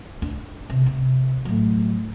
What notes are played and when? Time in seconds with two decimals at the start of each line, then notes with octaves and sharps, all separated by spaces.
0.22 D4
0.70 C3
0.86 C3
1.45 A2 F#3